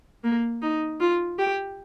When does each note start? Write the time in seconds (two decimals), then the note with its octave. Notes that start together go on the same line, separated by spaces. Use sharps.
0.24 A#3
0.62 D#4
1.00 F4
1.39 G4